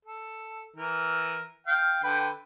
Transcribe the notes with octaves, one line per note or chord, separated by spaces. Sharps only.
A4
E3 A#4
F5 G5
D3 B4 G5